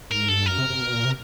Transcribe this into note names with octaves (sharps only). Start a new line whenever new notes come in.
G#2 A#4
G2 A4
F#2 A#4
C3
C3
B2
A#2
C3